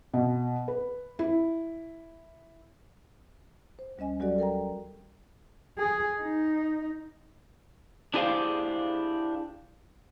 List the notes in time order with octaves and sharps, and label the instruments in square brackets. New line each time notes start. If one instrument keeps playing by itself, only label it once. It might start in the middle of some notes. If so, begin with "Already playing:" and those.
[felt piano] B2
B4
E4
[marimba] C5
D2 G3 C#4 D#5 G#5
F#3 G3 F#4 G4 A4 D5
A4 A#4 G5 A#5
[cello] G#4
D#4
[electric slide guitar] D4 E4 G4 G#4 C5 F5